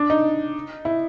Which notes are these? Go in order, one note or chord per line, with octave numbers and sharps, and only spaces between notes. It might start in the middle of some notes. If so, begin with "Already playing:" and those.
Already playing: D4
D#4
E4